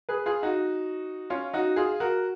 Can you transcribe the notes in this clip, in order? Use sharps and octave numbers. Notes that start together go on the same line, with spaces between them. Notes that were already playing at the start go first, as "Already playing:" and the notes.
G#4 B4
F4 G#4
D#4 F#4
C#4 F4
D#4 F#4
F4 G#4
F#4 A#4